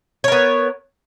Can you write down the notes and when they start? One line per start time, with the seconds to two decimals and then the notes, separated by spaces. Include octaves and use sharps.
0.24 C#5
0.28 A#4
0.32 B3